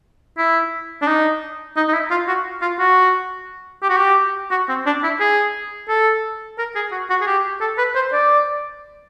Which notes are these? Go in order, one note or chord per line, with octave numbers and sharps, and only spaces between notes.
E4
D4
D#4
D#4
D#4
E4
F4
F#4
F4
F#4
G4
F#4
G4
F#4
C4
D4
E4
G#4
A4
A#4
G#4
F#4
F#4
G#4
G4
A4
B4
C5
D5